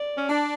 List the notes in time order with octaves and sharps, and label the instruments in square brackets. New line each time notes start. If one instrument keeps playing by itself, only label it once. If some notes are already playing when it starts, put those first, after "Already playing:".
Already playing: [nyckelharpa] D5
[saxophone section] C#4
D4